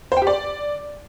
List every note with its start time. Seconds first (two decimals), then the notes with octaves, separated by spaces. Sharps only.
0.12 C5
0.17 G5
0.22 G4
0.27 D5